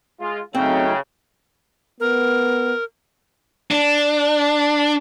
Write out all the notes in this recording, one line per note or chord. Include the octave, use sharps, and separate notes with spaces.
G#3 F4
C#3 F#3 A3 C4 D#4 G5
B3 A#4
D4